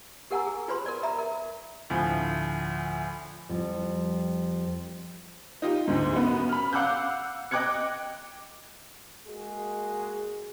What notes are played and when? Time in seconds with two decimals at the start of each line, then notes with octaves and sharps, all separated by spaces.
0.31 G4 A#4 F#5 G#5 A#5 E6
0.47 G#4
0.68 F4 B4 C5 B5 C6
0.86 A#4 D5
1.03 E5 A#5 B5
1.18 A#4
1.90 D2 A2 F3 G#5
3.49 F2 G3
5.62 D#4 F4 G4
5.88 D2 G#2
6.13 F#2 B3
6.49 B5 F6
6.73 F5 F#5 D6 E6 F#6 G6
7.51 D#5 G5 D6 F#6 G#6 C#7
9.27 G#3 A#3 F#4 G#4